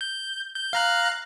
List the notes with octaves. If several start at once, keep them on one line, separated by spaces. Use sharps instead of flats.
G6
G6
F5 A#5 F#6